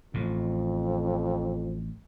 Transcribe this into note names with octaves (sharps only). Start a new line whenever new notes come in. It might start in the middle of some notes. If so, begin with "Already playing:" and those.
A1 F2 A2